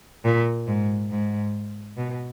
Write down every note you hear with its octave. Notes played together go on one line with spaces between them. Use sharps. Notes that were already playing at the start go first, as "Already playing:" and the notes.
A#2
G#2
G#2
B2